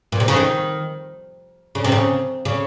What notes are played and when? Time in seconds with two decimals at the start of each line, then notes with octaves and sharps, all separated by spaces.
0.12 A#2
0.20 C3
0.28 C#3
0.36 D#3
1.75 C#3
1.84 C3
1.92 C#3
2.45 C#3